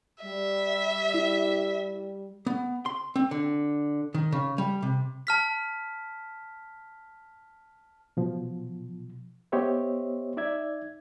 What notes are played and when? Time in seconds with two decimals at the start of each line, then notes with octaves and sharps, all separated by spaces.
0.24 G3 E5
1.14 E4
2.46 B3
2.86 C6
3.16 C4
3.31 D3
4.14 D#3
4.32 C#3
4.58 G3
4.82 C3
5.27 A5 F6 B6
8.17 B2 F3
9.52 B3 G4 C5 C#5 D#5 E5
10.37 D#4 D5 E5 G#6